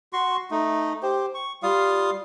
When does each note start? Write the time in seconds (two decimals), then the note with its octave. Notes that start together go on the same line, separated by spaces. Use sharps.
0.13 F#4 C6 C#6
0.51 A3 D#4
1.03 G4 C5
1.34 C#6
1.63 G3 F4 F5 D#6